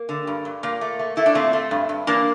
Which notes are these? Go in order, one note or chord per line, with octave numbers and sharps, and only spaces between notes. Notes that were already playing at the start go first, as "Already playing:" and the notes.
Already playing: A#3
D3
G2
G2
A#2 A#3
A3
A3
A3 E4
D4
A#2 A3 C4
A3
G2
G2
E3 A#3 D4